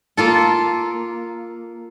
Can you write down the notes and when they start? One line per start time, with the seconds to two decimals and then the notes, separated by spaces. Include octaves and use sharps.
0.17 A#3 F4 A4